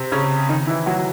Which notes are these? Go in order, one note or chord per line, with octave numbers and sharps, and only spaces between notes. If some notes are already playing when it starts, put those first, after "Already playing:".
Already playing: C3 C4
C#3 C#4
D#3 D#4
E3 E4
F#3 F#4